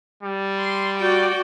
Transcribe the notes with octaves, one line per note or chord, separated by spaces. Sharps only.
G3
C6
F#4 D5 G5